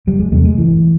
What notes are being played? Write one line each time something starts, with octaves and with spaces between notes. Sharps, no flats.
F#1 G3
G#3
E2 C3 A3
G#3
F#1 E3